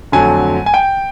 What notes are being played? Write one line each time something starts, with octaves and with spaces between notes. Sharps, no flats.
F2 D3 F#3 A3 G#5
G#5
G5